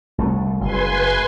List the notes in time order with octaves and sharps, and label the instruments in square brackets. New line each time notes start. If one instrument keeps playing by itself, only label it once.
[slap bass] C2 A3
[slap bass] F#1 [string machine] B4 G#5 C6